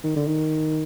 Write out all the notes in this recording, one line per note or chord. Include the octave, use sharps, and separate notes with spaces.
D#3
D3
D#3